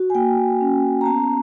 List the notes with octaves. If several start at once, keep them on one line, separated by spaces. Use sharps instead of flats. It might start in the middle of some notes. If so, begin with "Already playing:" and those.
Already playing: F#4
G#5
A#3 G5
A#3
C#4
C#4
A#5
B3 A5